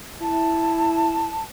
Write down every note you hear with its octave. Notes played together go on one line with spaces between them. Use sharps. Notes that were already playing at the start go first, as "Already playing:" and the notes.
E4 A5